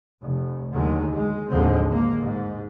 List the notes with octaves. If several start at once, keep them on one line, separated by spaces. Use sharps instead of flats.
F1
D#2 D3 D#3 F#3 G#3
G#3
A1 D#2 D3 F3 G#3 C4
G#3 A#3
G#2